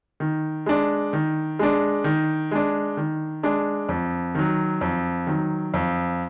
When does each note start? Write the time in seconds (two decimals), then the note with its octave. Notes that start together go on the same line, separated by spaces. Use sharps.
0.20 D#3
0.66 G#3 D4
1.13 D#3
1.59 G#3 D4
2.04 D#3
2.51 G#3 D4
2.97 D#3
3.43 G#3 D4
3.89 F2
4.35 D#3 F#3
4.81 F2
5.27 D#3 F#3
5.74 F2